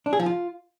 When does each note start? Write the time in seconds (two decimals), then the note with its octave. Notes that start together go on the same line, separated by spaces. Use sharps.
0.06 D4
0.13 G#4
0.19 F3
0.26 F4